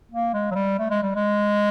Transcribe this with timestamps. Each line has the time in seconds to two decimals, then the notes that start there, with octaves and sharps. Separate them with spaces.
0.11 A#3
0.34 G#3
0.51 F#3
0.55 G3
0.79 A3
0.90 G#3
1.03 G3
1.16 G#3